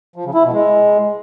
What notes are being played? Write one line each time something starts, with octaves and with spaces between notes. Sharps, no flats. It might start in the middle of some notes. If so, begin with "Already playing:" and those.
F3
C#3
E4
B2
G#3